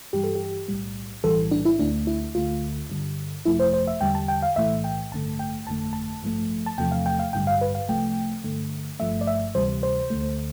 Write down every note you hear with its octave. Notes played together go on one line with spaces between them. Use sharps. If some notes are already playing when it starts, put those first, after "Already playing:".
G2 E3 G3 G4
A4
G4
B1 A2 G3
B1 A2 E3 G3 A4
D4
E4
D2 D3 A3 D4
E4
D2 D3 A3 F4
G2 D3 G3
G1 F2 C3 F3 A3 E4
C5
C5
E5
E2 D3 G3 G5
A5
G5
F5
B1 A2 E3 A3 E5
G5
A1 G2 D3 A3 A5
G5
G1 F2 D3 A3 A5
A5
A1 G2 F3 A3
A5
E2 C3 F3 A3 G5
F5
G5
F5
A1 G2 D3 G3 G5
F5
B4
F5
C2 C3 F3 A3 G5
G2 D3 A3
G1 G2 F3 A3 E5
D5
E5
D2 C3 E3 G3 C5
C5
D2 D3 A3